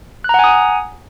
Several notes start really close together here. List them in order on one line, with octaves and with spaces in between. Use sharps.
F#6 A#5 F#5 G#5 D#6